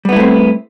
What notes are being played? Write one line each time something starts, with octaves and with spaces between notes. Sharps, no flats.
G3 A3 B3 C4 E4